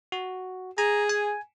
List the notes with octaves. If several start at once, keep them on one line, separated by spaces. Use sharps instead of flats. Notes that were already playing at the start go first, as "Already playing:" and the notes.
F#4
G#4 A#5
G#5